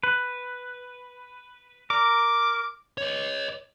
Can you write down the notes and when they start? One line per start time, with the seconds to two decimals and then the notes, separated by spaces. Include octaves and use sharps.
0.03 B4
1.90 A#4 D6
2.98 C#5 D#5